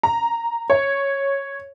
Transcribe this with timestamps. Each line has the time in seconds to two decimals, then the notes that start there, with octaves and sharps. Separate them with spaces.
0.03 A#5
0.70 C#5